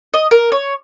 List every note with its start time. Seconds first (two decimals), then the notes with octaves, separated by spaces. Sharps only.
0.14 D#5
0.31 A#4
0.52 C#5